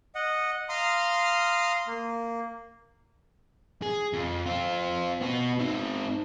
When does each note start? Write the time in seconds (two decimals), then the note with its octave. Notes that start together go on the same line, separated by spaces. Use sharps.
0.15 D#5 F#5
0.69 F5 A#5 C6 D#6 F6
1.87 A#3
3.82 G#4
4.13 F2
4.46 C4 F4
5.21 B3 F#4
5.59 C4 D#4